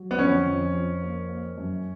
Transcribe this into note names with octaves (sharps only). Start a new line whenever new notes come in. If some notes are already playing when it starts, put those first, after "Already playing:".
Already playing: F#3
B3
F2 C#4
F2
F2
A#3
A#3
F#2